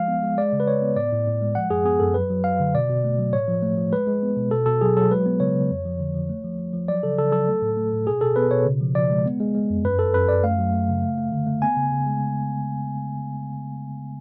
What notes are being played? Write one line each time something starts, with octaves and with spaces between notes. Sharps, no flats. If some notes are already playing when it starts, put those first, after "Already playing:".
Already playing: F3 G#3 F5
B3
G#3
G#3 D5
C#3
B4
G#3 C#5
B3
A2 D5
A2
A2
G#3
F3 F#5
F#2 G#4
B3 G#4
F#2 A4
F#3 B4
F#3
F#3 F5
D3
B2 D5
B2
A3
F#3
A2 C#5
F3
A3
F3
G#3 B4
G#3
B3
B2
B2 A4
B2 A4
F#3 G#4
F#3 A4
G#3 B4
B3
C#3 C#5
C#3
F2
F3
D3
F3
A3
F3
F3
F3
F#3 D5
C#3 A4
C#3 A4
F#3 A4
A3
A2
A3
A2
B2 G#4
B2 A4
B3 B4
B2 C#5
C#3
F3
F3 D5
G#3
B3
G#3
G#3
F2
F#2 B4
F#2 A4
F#2 B4
F#2 D5
A3 F5
F#3
A3
C#3
A3
A3
D3
A3
B3 G#5
C#3
C#3
G#3